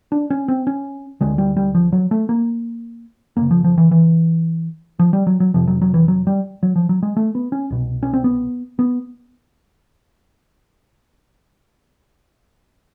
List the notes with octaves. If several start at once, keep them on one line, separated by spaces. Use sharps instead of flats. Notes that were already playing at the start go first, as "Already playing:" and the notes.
D4
C#4
C4
C#4
D2 D3 G#3
G3
G3
F3
F#3
A3
A#3
F#2 C#3 A#3
F3
F3
E3
E3
F3
G3
F#3
F#3
F2 C3 F3
F#3
F#3
E3
F#3
G3
F#3
F3
F#3
G#3
A3
B3
C#4
C2 B2
C#4
C4
B3
B3